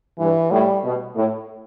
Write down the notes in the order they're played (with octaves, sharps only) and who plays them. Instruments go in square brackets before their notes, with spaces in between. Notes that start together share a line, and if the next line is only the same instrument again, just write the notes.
[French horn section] G2 [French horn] E3
[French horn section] A2 [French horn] G3
[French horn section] B2
A2